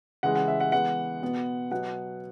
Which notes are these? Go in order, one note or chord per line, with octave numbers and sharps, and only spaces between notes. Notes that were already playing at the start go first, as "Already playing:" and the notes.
C#3 E3 G#3 F#5
F#5
E5
F#5
E3 G#3 B3 F#5
B2 B3
B2 F#3 B3 F#5